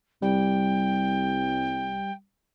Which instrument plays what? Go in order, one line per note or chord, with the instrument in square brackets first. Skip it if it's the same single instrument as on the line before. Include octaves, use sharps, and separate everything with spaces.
[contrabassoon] C2 [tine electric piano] G3 [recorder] G5